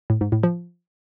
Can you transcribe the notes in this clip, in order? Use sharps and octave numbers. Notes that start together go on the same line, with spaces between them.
A2
G#2
A2
F3